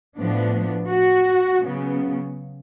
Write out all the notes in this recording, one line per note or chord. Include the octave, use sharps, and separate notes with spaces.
A2 F3 B3 D4
F#4
C#3 F#3 B3